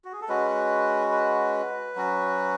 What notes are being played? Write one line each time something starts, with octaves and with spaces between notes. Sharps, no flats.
F#4
G#4
A4
G#3 C#4 F#4 B4
B4
F#3 C#4 F#4